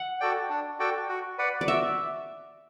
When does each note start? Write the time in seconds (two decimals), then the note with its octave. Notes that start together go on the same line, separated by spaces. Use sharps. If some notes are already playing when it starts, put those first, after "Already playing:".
Already playing: F#5
0.20 F#4 A4 D5 G5
0.50 D4
0.79 F#4 A4 D5 G5
1.09 F#4
1.38 B4 D5 F#5
1.61 D5
1.68 F#4 E5